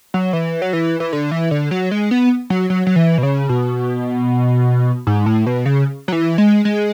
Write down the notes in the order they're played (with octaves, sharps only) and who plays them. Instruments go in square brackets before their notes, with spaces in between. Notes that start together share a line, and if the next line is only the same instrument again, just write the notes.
[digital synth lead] F#3
E3
F#3
E3
E3
D3
E3
D3
F#3
G#3
B3
F#3
F#3
F#3
E3
B2
C#3
B2
G#2
A2
B2
C#3
F#3
E3
G#3
G#3